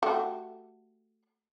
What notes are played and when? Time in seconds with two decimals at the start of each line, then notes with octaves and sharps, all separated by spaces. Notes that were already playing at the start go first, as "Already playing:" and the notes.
0.03 A3 F#4 G4